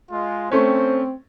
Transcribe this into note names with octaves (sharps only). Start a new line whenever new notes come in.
G#3 F4
A3 C4 C#4 C5